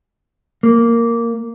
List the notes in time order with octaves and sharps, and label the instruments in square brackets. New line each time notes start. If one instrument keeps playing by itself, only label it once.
[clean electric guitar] A#3